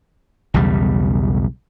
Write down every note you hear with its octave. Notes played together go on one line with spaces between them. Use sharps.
B1 E2 C#3 G3